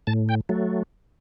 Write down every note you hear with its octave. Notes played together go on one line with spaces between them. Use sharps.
A2 A5
G5
F#3 A3